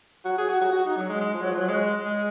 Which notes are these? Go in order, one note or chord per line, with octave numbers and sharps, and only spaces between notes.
F#4
G#4
F#4
F#4
F#4
D#4
F#3
G#3
G#3
F3
F#3
F3
F#3
G#3
G#3